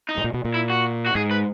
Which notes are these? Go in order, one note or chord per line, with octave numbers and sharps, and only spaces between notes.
D#4
G#2
A#2
B2
A#2
E4
F#4
F#4
G#2 G#4
B4